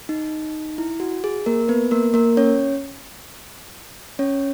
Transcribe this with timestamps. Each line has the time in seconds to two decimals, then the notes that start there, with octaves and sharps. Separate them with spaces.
0.09 D#4
0.78 E4
1.00 F#4
1.24 G#4
1.46 A#3 A#4
1.68 B3 B4
1.91 A#3 A#4
2.14 A#3 A#4
2.37 C#4 C#5
4.19 C#4 C#5